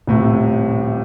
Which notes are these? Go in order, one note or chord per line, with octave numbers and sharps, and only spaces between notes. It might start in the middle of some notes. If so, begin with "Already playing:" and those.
D#1 A2 C3